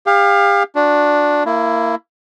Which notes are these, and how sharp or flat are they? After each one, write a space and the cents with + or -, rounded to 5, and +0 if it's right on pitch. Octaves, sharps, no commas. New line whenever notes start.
G4 +40 F5 +10
D4 +0 F#4 -30
A#3 -15 E4 +10